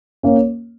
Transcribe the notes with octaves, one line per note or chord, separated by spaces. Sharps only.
A#3 C#4